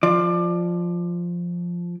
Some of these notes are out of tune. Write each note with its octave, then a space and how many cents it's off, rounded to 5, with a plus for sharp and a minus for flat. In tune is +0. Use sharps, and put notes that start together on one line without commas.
F3 +0 D5 +25